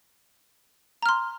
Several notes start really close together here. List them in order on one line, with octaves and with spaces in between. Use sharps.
A#5 F6 C6